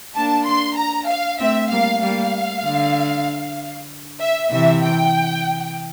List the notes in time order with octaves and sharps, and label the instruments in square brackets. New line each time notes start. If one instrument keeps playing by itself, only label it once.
[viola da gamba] A#3 D4 [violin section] A5
[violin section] C6
A#5
F5
[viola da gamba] A3 C4 [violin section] E5
[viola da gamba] G3 A#3 [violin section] F5
[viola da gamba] G3 A#3 [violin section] F5
[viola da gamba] D3
[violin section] E5
[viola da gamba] C3 E3 [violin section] E5
[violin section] G5